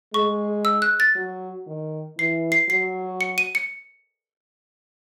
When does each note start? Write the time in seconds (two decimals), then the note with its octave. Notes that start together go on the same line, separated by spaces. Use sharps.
0.14 G#3 C#6
0.65 E6
0.82 F#6
1.00 A6
1.16 F#3
1.67 D#3
2.18 E3 C7
2.52 C7
2.69 F#3 C7
3.21 C#7
3.38 D#7
3.55 C#7